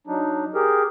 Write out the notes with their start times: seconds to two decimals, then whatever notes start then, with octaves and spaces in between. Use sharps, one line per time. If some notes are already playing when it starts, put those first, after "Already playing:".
0.07 F#3 D4 D#4
0.55 G4 G#4 A#4